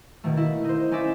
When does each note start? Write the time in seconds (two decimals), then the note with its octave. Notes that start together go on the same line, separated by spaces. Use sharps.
0.24 B2 D#3 A3
0.36 A#3 E4
0.64 D#4 C5
0.91 C#4 D#4 E4 D5 E5